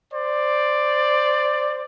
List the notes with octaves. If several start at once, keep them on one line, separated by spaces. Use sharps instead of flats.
C5 D5